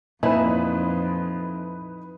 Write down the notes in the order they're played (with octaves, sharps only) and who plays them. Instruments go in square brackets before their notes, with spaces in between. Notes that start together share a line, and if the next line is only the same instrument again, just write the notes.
[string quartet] F2 [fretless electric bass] A#2 [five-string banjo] E3 E4 [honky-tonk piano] D#4 B4